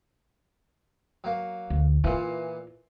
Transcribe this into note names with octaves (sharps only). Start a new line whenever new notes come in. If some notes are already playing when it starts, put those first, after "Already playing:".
F#3 A#3
D2
A#2 E3 E4 F4